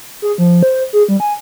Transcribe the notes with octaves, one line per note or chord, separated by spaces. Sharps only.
G#4
F3
C5
G#4
G3
G#5